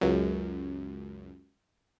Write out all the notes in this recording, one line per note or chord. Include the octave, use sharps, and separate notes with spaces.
C#2 F#2